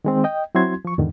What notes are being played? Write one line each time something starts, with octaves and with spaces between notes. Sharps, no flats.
D#3 G#3 C4
D#5 G5
F#3 C4 E4 F#4 C6 G#6
F3 C#6
E2 G#2 D3 D#3